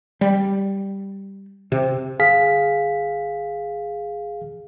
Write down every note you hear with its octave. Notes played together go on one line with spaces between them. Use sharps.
G3
C3
G1 G#4 F5 B6